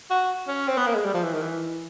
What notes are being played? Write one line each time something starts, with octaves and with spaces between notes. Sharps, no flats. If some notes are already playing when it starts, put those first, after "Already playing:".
F#4
C#4
C4
B3
A#3
G#3
G3
F3
E3
D#3
E3